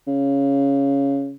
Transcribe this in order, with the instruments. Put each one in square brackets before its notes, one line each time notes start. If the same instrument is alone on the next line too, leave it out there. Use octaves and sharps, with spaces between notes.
[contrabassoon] C#3